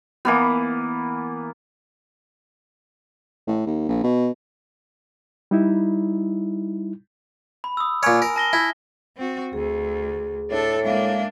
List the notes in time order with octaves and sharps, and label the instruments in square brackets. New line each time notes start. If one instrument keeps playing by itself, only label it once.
[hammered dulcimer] E3 A#3 B3
[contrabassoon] A2
D#2
A#1
B2
[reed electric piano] G3 D#4 E4
[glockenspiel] B5
D#6 E6
[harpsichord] A#2 C#5 [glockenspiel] G#5 F6
[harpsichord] A#4
[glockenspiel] A5 A#6 G7
[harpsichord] E4
[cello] C4 F#4
[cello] D2 [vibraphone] G#4
[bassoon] A2 [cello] D4 A4
[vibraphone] G#3 E5 F5 [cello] A#3 D4